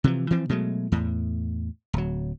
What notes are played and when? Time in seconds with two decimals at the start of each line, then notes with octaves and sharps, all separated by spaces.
0.04 C3 E3 F3
0.30 E3 F3 C4
0.49 B2 F#3 G#3 A3
0.92 E2 A2
1.93 D1 F#3